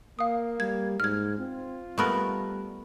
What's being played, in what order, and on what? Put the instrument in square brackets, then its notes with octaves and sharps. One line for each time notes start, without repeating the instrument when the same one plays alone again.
[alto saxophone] A#3 [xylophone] F5 D#6
[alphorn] G3 [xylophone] G#6
[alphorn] G#2 [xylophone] F6 G#6
[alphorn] C4 [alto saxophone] F4
[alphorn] G3 [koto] A3 B3 A#4